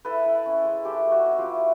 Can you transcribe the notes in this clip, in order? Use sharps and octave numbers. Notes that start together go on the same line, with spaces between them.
E4 A4 B4
E4
C#4
G#3
A3 G4 A4
A3
F#4
C#4
F4 G4
E4